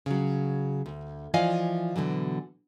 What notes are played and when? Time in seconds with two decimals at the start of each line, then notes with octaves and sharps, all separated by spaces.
0.06 C#3 F#3
0.86 D2
1.34 E3 F3 D5 D#5 F5 G#5
1.96 B2 D3 E3 F#3